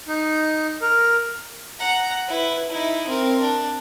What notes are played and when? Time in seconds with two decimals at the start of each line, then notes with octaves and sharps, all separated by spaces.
0.08 D#4
0.81 A#4
1.79 F#5 A#5
2.28 E4 B4
2.70 D#4 E4
3.07 C4 A#4
3.41 D4